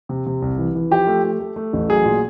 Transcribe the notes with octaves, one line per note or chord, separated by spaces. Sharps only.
C3
C3
C2
E3
E3
F3 G4
A3
A3
A3
A3
A1
F#3 G#4
A#2